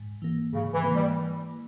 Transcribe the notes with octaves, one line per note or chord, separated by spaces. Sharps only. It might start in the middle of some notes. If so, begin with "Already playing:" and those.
Already playing: G#2
E3 A#3
G#2 C#3
E3
E3 A#3
G3